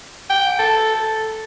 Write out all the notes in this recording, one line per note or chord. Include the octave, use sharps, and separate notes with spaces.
G5
A4
A4